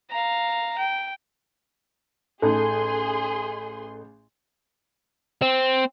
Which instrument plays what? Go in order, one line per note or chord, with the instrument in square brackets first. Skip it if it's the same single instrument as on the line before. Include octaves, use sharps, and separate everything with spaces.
[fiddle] F5 A#5
G5
[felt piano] A1 D#4 [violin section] G#4 C6 [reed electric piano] A4
[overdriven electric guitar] C4